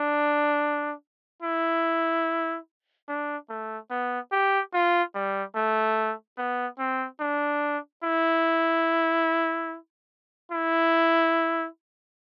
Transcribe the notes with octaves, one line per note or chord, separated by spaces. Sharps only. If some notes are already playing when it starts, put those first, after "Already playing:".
Already playing: D4
E4
D4
A3
B3
G4
F4
G3
A3
B3
C4
D4
E4
E4